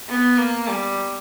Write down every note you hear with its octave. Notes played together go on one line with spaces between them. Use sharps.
B3
A#3
G3